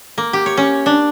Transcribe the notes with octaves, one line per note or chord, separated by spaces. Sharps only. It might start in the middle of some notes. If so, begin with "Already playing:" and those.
A#3
G4
C#5
C#4
D4